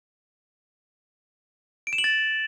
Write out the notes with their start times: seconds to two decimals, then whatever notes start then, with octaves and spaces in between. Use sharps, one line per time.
1.87 D7
1.93 E7
1.98 F#7
2.04 A6